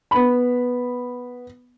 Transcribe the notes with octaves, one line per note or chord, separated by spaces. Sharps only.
B3 B5